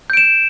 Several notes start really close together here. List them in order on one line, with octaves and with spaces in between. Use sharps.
G6 D7 E7